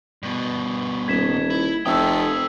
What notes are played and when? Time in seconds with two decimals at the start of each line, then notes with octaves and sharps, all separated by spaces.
0.23 G2 B2
1.08 D#1 G#6 B6 E7
1.50 E4
1.86 F1 A4 G5 D#6 E6